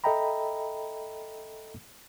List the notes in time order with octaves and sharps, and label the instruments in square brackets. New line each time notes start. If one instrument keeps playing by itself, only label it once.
[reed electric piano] A4 D#5 E5 G5 A#5 B5